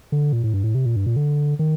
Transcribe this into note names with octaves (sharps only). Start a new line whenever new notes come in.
D3
A#2
A2
G2
A2
C3
A#2
G2
A#2
D3
D#3